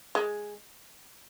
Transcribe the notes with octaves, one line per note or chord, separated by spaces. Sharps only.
G#3